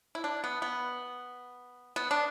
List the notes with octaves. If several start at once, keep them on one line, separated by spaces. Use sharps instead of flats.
E4
D4
B3
B3
B3
D4